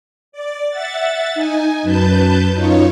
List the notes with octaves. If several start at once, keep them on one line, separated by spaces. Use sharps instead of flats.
D5
E5 F#5 A6
D#4 G#5
F#2 B4 A5 G6
F#2 D#4 F4 C#5